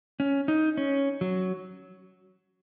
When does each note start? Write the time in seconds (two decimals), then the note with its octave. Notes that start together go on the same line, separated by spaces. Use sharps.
0.20 C#4
0.48 D#4
0.77 C#4
1.21 F#3